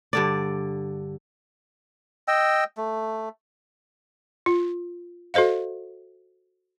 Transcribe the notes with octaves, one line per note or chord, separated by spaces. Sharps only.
G2 D3 D5
D#5 G5 E6
A3
F4
F#4 A4 C5 D#5 F5